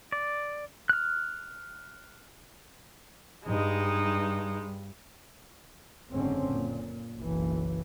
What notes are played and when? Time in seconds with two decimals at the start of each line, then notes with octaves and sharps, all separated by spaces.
0.12 D5
0.89 F6 F#6
3.46 G2 G#3 D#4
6.11 F#1 G#2 D3 C4 C#4
6.47 A#2
7.17 F#1 B1 E3